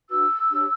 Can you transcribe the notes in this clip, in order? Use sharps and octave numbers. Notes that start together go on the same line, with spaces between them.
D4 F#4 B4 E6
D4 G4 C#5